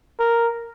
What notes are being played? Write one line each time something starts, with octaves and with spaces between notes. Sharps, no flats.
A#4